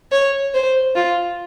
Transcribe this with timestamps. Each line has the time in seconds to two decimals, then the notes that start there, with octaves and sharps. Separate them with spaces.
0.12 C#5
0.54 C5
0.95 F4